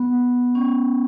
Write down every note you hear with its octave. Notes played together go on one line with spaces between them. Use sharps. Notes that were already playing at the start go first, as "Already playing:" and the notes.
Already playing: B3
C#4